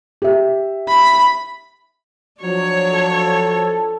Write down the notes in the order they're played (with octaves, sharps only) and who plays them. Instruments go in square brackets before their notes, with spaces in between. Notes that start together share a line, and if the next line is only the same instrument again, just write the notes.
[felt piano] G4 E5
[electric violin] B5
[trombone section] F3 [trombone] F#3 [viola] D4 C#5
[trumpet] A4